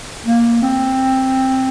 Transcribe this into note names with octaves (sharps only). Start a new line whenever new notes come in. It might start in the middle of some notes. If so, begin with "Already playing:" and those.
A#3
C4